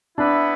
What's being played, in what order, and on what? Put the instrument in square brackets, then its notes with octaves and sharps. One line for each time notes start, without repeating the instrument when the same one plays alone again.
[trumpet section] B3 E4 B4 E5 [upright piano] D4